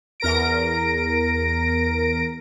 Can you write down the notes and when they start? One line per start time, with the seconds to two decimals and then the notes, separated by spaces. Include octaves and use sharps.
0.20 E2 A#4 A#6 D7